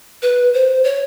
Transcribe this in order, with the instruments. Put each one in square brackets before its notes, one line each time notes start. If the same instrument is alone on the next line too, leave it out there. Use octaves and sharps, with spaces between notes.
[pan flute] B4
C5
C#5